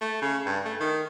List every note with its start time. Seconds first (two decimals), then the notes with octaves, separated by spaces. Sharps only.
0.01 A3
0.22 C#3
0.46 G2
0.65 A3
0.80 D#3